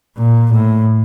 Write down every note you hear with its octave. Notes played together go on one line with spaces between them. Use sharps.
A#2
A2